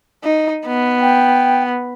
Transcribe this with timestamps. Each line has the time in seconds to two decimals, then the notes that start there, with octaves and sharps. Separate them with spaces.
0.24 D#4
0.67 B3
1.01 G5